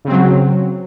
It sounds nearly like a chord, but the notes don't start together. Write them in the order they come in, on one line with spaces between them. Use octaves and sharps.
C#3 C4 F#3